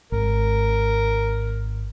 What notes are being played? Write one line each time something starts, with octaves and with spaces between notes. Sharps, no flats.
G#1 A#4